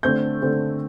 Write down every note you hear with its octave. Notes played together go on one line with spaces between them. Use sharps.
D3 A3 C4 G6
D3 A3 C4